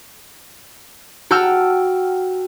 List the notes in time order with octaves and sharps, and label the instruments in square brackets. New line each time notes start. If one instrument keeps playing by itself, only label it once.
[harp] F#4 G5 A5 E6 F6